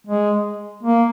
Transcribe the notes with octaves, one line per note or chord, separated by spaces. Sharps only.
G#3
A#3